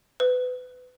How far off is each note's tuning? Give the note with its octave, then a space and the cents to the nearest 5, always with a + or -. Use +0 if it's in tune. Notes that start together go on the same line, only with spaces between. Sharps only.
B4 +25